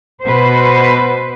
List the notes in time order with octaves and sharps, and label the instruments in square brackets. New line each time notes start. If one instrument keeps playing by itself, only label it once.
[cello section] B2 B4 C5